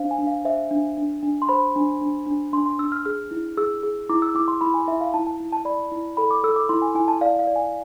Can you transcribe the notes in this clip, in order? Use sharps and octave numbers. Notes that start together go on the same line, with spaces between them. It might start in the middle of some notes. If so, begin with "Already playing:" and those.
Already playing: D4 C5 F5
G#5
D4
F5
C5 E5
D4
D4
D4
C6
C5 B5
D4
D4
D4
D4 C6
C6
D4 E6
F6
G#4 F6
E4
G#4 E6
G#4
E4 D6
E6
E4 D6
C6
E4 B5
G#5
E4 E5
F5
E4 A5
A5
E4
A5
D5 B5
E4
A4 B5
D6
A4 E6
D6
E4 C6
G#5
E4 G#5
A5
D5 F5
F5
D5
G#5